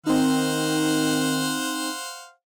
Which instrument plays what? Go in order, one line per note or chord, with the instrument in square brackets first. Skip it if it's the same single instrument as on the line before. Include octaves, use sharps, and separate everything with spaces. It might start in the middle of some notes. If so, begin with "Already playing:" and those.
[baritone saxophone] D#3 [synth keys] C4 D#4 [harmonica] C5 F5 F#5